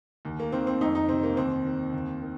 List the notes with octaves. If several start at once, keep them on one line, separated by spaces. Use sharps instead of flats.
D#2
A#3
D#3 C4
C4
F2 D#4
D#4
C3 C4
A#3
D#2 C4
D#3
D#2
D#3